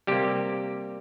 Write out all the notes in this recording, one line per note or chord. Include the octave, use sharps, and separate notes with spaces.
C3 G3 A#3 G4